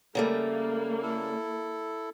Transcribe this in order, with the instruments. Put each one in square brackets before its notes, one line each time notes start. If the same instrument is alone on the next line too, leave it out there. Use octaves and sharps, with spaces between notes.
[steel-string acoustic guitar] C#3 G3 A3 [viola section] A#3
[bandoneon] E4 A4